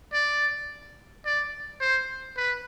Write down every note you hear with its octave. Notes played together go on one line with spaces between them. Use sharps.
D5
D5
C5
B4